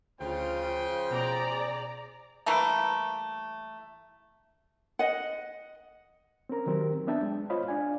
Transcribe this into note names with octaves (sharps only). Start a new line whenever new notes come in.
D2 C#3 F3 F4 C5 G5
B2 G#4 D5 A#5
E3 G3 A3 A#3
D#5 F#5
C4 C#4 A#4 A#5
D#3 F#3 C4 G4 A#4
B3 D4 E5 G5 A5
G#3
F4 C5 C#5 D#5 F5 B5
D4 D5 F5 G#5